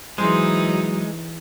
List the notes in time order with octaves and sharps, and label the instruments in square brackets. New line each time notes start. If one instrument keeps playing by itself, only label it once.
[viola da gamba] E3 D#4 [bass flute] F#3 [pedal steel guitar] G#3 [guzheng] G#4 A#4 C5